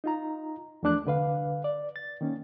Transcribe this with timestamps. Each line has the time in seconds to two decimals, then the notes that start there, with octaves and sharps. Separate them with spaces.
0.04 D#4 F4 A#5
0.83 E2 F3 A3 D4 D6 F#6
1.05 C2 D3 B4 F5
1.64 D5
1.96 A6
2.21 D#3 A#3 C#4